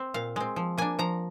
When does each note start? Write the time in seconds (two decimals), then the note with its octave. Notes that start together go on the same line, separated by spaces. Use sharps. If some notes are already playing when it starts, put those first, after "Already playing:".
Already playing: C4
0.14 A#2 F5
0.36 G#3 C4
0.56 F3
0.78 A#3 D4 G#5
0.99 F3 A#5